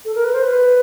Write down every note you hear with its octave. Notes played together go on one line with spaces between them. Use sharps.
A4
A#4
B4
C5
B4